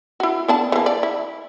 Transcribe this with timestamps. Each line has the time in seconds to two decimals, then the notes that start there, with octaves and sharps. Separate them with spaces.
0.20 E4 F#4
0.48 B3 D4 A5
0.72 E3 A#3
0.86 D5
1.03 E4